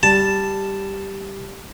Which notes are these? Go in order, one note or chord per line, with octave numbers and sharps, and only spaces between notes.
G3 A5